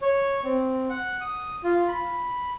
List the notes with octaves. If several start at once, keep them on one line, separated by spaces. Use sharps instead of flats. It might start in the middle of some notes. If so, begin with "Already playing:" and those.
C#5
C4
F#5
D#6
F4
B5